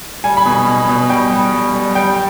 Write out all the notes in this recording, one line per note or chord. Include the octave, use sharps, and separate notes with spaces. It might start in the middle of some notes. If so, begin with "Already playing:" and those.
G3 G#5
B5
B2
G#5
B2
B2
G3 G5
G3
G3
G3
G3 G5